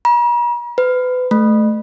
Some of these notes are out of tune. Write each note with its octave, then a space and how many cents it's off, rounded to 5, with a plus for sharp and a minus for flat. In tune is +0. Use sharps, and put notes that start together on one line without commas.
A#5 +45
B4 +30
A3 -15